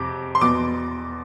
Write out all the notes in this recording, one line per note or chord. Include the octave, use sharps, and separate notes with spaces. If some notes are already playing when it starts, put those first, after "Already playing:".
Already playing: F2 C3 D6
C6
E2 B2 D6